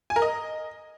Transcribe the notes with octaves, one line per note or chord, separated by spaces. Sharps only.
G#5
A#4
D#5